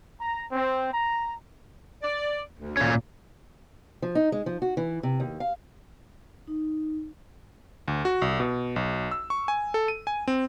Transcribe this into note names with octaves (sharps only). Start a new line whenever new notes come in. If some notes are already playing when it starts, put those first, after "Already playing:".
A#5
C4
A#5
D5
D2
A#2 C#4
F3
D#4
G#3
F3
F#4
E3
C3
D#2
F5
D#4
D2
F#4
C2
B2
B1
E6
C#6
G#5
A4
D#7
G#5
C4